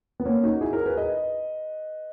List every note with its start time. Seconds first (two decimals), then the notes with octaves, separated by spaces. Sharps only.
0.20 B3
0.25 A#3 C#4
0.43 D#4 F#4
0.61 E4 G#4
0.73 F#4 A#4
0.86 G#4 B4
0.97 B4 D#5